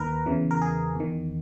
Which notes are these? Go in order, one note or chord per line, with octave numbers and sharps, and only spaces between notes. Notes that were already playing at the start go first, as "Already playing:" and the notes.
Already playing: D#2 D#3 A#4 B4
E2 C#3 E3
A#4
G#4
E2 D#3